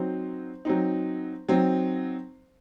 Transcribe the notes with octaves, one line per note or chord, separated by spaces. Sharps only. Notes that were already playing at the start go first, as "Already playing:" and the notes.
Already playing: F#3 C4 D#4 C5
F#3 C4 D#4
F#3 C4 D#4